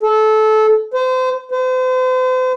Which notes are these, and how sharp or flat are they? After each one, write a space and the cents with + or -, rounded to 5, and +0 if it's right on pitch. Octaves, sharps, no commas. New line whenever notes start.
A4 -20
C5 -30
C5 -40